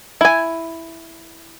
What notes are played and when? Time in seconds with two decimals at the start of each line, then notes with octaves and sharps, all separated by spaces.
0.21 E4 G#5